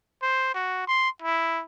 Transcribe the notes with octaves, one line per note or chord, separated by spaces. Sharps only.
C5
F#4
C6
E4